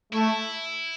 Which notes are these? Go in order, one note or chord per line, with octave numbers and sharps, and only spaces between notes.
A3 E4